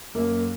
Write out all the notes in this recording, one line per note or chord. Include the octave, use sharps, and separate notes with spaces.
F#2 A#3